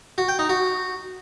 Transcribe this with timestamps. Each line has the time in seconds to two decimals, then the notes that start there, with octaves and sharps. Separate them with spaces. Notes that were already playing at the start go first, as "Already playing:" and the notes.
0.18 F#4
0.28 G5
0.39 D#4
0.49 F#4